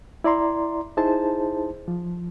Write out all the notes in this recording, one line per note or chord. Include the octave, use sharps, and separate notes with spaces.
E4 D5 A#5 C6
D#4 E4 G#4 C5 A5
F3